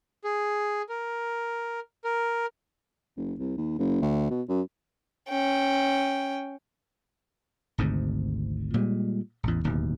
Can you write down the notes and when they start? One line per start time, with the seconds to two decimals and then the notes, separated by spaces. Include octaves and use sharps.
0.24 G#4
0.89 A#4
2.04 A#4
3.17 F#1
3.39 C2
3.57 D#2
3.78 F#1
4.02 D2
4.30 B2
4.49 F#2
5.29 C#4 G5
7.78 G#1 D2 G#2 C3
8.74 A#2 G3 G#3
9.43 A1 E2
9.64 D1 D#2 B2